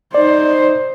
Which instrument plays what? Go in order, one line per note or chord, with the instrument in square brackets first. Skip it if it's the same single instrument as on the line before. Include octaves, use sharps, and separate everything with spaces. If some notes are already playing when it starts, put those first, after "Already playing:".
[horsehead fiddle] D#4 C5 [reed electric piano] D5